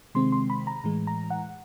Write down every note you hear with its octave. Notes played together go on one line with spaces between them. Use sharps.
C3 D#3 G#3 C4 C6
C6
B5
A#5
A2 E3 G#3
A#5
F#5